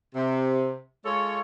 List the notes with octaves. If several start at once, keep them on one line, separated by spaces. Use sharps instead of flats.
C3
G#3 F4 A4 C#5